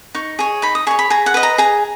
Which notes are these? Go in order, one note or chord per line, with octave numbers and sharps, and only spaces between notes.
D#4 C#6
G#4 C#5
D#4 B5
D#6
G#4 C#5 C#6
B5
G#4 A#5
F#5
B4 D#5
A#5
G#4 A#5